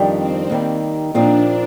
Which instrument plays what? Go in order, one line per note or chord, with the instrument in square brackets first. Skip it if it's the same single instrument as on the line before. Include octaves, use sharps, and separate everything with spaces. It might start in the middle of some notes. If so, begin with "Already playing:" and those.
Already playing: [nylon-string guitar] F2 D#3 G3 D4 G4
[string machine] C4
[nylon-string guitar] D#2 D#3 G3
[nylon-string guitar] A#2 F3 C4 D#4 [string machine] D4